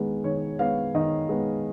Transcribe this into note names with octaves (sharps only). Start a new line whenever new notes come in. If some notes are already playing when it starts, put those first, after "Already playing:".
Already playing: D#3 G#3 B3
D#3 C#5
G#3 B3 F5
D#3 D#5
G#3 B3